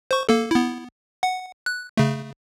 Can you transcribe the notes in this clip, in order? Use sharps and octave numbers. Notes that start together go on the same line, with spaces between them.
C5 C#6
A#3 A4
B3 E4
F#5
F#6
C#3 A3